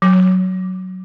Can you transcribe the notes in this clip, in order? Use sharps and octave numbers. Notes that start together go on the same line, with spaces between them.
F#3